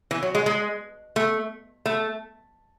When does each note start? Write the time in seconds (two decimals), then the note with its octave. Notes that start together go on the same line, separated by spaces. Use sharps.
0.11 E3
0.23 F#3
0.35 G#3
0.46 G#3
1.16 A3
1.86 A3